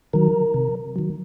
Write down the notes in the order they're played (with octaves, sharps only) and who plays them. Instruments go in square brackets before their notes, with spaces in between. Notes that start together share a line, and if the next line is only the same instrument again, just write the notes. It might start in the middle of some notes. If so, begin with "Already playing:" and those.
[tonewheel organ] D#3 F#3 A#4
C3
D#3 F#3